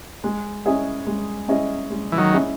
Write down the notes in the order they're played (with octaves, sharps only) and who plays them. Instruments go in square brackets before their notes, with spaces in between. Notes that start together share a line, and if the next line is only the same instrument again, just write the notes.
[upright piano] G#3
C#4 E4 G#4 D#5
G#3
C#4 E4 G#4 D#5
G#3
[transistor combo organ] E3
D#3 F#3
[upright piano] C#4 E4 G#4 D#5